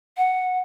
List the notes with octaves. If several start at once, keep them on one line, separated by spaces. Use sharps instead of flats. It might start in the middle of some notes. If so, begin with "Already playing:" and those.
F#5